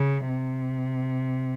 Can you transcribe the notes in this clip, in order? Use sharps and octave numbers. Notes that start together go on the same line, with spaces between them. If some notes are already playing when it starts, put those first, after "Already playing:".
Already playing: C#3
C3